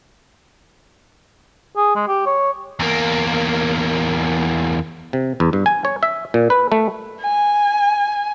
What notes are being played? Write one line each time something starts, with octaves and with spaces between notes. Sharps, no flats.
G#4
G#3
G4
C#5
E2 A#3
C3
E2
G2
G#5
C#5
E5
A#2
B4
A3
G#5